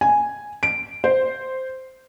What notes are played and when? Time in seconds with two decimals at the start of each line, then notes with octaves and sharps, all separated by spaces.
0.01 G#5
0.63 D7
1.04 C5